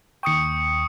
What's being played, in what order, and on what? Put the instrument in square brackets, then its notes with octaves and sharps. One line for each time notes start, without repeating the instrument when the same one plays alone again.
[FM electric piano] D#2 G5 [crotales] C#6 D#6 C#7